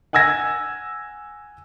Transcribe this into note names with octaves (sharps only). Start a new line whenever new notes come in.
F#5 G#5 E6 G#6 A#6